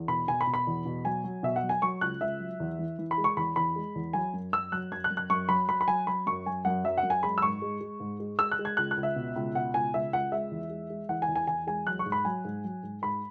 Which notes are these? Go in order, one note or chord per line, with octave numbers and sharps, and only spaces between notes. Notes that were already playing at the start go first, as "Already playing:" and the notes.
Already playing: E2
B2 B5
B2 G#5
B5
B2
B5
E2
B2
F#3 G#5
F#3
B2 E5
F#5
F#3
G#5
F#3 C#6
C#2 F#6
C#2 E5
F#3
E2
E3
E3
B5
G#3
C#6
E2 B5
E2 B5
G#3
E2
F#3 G#5
F#2
F#2 E6
F#3 F#6
F#2 G#6
F#6
F#2
F#6
F#2 C#6
F#3 B5
F#3 B5
B5
F#3 G#5
F#3 B5
F#2 C#6
F#3 G#5
F#2 F#5
F#3 E5
F#5
F#2
G#5
G#3 B5
E6
G#2 C#6
G#3
G#3
G#2
G#3
G#3 E6
F#6
G#3
G#6
C#2 F#6
F#6
C#2
E5
B2
C#2
B2 F#5
C#2 G#5
C#2 E5
C#2 F#5
G#3 E5
E2
G#3
G#3
E3 F#5
G#5
E2
G#5
E2 G#5
G#3 G#5
F#3 F#6
C#6
G#2
B5
F#3 G#5
G#2
F#3
G#2
G#2 B5